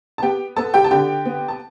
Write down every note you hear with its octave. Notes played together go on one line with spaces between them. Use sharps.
A5
B3 G4 G5
B3 A4 A5
G4 G5
A5
D3 G4 G5
B3
A5